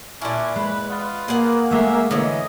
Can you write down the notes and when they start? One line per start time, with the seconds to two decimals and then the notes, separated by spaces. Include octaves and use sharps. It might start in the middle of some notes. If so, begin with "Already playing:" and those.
0.22 A#2 C#4 D4 E4
0.56 G#3 B4
0.90 B3 F4
1.28 A#3 G#4 F#5
1.71 G#3 A3 F#4 A#4 E5
2.11 D3 E3 C#4 D#5